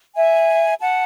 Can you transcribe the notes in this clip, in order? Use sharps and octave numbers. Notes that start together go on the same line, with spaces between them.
E5 G#5
F#5 A5